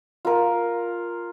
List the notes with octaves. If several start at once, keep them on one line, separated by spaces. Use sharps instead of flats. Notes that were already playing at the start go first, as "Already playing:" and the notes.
F4 A#4